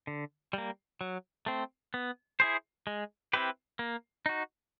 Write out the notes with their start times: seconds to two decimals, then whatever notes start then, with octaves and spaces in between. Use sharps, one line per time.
0.07 D3
0.53 G3 A#3
1.01 F#3
1.46 A3 C4
1.94 B3
2.40 E4 G#4 C5
2.87 G#3
3.33 C4 E4 G4 B4
3.79 A#3
4.26 D#4 F#4